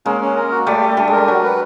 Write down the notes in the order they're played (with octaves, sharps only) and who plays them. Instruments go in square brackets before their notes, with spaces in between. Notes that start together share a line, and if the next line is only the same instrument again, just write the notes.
[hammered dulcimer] G#3 A#3 [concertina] C#4
[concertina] C#4
A#4
F#4
[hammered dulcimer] G3 A3 [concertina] D5
[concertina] G4
[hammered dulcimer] G3 A3 [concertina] D4
[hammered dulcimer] G#3 [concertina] A#4
[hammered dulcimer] G3
[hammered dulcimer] F#3 [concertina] F#4
[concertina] B4